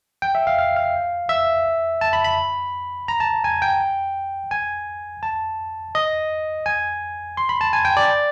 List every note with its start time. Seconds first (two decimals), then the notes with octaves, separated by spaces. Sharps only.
0.22 G5
0.35 E5
0.47 F5
0.59 F5
0.76 F5
1.29 E5
2.01 A5
2.13 B5
2.24 B5
3.08 A#5
3.20 A5
3.44 G#5
3.62 G5
4.51 G#5
5.23 A5
5.95 D#5
6.66 G#5
7.37 C6
7.49 B5
7.61 A5
7.73 G#5
7.85 G5
7.97 D5